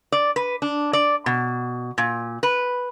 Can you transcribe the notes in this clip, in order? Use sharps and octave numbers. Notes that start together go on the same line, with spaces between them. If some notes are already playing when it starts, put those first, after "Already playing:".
D5
B4
D4
D5
B2
A#2
B4